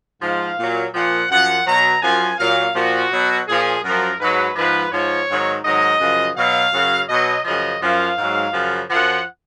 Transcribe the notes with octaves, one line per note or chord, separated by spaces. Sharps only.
G#2 F3 F5
A#2 F#3
A#2 F3 F#5
F#2 F3 F#5
B2 F#3 A#5
F#2 F3 G#5
A#2 F#3 F5
A#2 F3 F#4
B2 F#3
A#2 F3 G#4
F#2 F3 A#4
G#2 F#3 B4
G#2 F3 B4
G#2 F3 C#5
G#2 D#3 F#3
G#2 D#3 F#3 D#5
F#2 C#3 F3
B2 F#3 F5
F#2 C#3 F#3
B2 F#3 D#5
F#2 C#3 F3 D#5
F#2 F3 F5
G#2 F#3
F#2 C#3 F3
F#2 F3 F#5